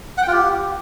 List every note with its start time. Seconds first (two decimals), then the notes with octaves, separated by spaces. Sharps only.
0.18 F#5
0.23 G5
0.28 F4
0.33 G4